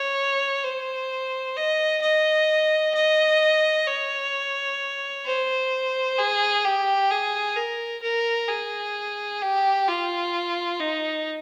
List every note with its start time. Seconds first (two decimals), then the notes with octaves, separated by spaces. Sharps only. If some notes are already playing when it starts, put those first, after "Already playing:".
Already playing: C#5
0.64 C5
1.56 D#5
2.02 D#5
2.94 D#5
3.87 C#5
5.25 C5
6.18 G#4
6.65 G4
7.11 G#4
7.57 A#4
8.03 A#4
8.49 G#4
9.42 G4
9.88 F4
10.80 D#4